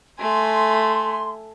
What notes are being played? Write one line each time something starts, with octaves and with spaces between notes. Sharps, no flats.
A3 G#5 C6